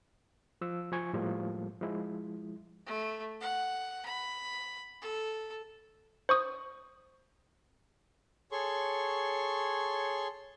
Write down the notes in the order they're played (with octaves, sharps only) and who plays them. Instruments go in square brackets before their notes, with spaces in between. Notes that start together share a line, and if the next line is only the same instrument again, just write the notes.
[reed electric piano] F3 E6
F3 F4 G#5 C#6 G#6
A2 F3 G3 G#3 A#3
F3 G#3 E4
[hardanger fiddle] A3
F#5
B5
A4
[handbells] C5 C#6 D#6
[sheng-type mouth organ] G#4 A4 C#5 C6 C#6